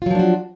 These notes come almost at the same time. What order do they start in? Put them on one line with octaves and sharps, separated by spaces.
F4 F#3 F3 D4 F#4